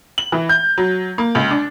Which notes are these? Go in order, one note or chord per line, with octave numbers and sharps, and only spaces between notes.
F#7
E3
G6
F#3
A#3
C#2
D4